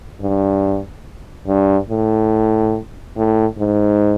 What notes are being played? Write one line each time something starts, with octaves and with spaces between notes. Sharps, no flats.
G2
G2
A2
A2
G#2